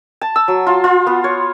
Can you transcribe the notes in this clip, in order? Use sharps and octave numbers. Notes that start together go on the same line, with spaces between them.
A5
E6
F#3
F4
F4
B3
C#5